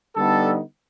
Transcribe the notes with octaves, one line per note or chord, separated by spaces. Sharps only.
D3 G3 B3 D#4 A4